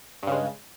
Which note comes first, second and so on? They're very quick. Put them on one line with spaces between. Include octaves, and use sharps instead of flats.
G2 C#3 G#3